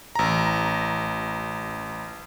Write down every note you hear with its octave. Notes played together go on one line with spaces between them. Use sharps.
A1 A#5